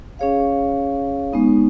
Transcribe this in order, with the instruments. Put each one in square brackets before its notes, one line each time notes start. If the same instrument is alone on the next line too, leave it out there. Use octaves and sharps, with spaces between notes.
[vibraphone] C#4 G#4 C#5 F5
G#3 B3 D#4